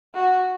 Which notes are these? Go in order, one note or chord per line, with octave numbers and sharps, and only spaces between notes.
F#4